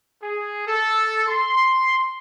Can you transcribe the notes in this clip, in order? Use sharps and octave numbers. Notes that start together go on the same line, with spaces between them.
G#4
A4
C6